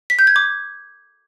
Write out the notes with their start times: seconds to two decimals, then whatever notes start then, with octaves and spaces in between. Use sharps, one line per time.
0.10 B6
0.19 G6
0.27 G#6
0.36 D6